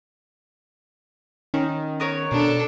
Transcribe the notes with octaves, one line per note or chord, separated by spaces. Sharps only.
D#3 C#4
B3 A#4 C#5
B2 D4 A4